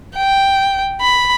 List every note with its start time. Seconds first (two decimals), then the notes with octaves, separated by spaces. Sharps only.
0.16 G5
1.01 B5